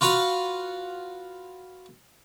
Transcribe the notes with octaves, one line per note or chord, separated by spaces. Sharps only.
F4 F#4 B4 F5 F#5